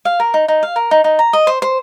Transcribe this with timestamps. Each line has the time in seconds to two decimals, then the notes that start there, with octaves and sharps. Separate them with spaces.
0.05 F5
0.20 A#4
0.34 D#4
0.48 D#4
0.63 F5
0.76 A#4
0.91 D#4
1.04 D#4
1.19 A#5
1.33 D#5
1.47 C5
1.62 C5